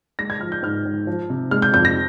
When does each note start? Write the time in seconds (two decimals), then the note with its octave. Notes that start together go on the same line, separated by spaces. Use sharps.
0.19 G#3 A#6
0.30 G#6
0.41 F3 F6
0.52 G6
0.63 G#2 F6
0.85 G#2
1.07 F3
1.30 C3
1.51 G#3 F6
1.62 G6
1.74 F2 G6
1.85 A#6